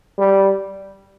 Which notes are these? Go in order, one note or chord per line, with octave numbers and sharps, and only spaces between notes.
G3